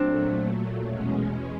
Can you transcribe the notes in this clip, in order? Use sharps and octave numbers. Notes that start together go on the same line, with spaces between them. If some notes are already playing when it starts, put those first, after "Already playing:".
Already playing: A#2 F#3 A3 C4 D4
E2 B2 G#3 C#4